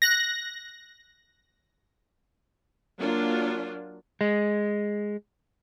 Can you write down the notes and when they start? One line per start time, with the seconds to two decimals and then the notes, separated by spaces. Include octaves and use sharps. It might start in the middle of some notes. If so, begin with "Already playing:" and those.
0.02 F#6 A#6
2.98 F#3 A#3 D4 F4
4.21 G#3